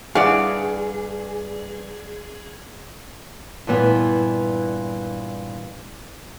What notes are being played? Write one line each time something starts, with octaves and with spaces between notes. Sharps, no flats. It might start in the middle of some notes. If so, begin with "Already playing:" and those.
G2 E4 G#4 D5 F5 F#5
G2 A#2 E3 B3